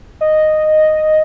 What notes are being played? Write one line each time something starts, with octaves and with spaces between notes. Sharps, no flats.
D#5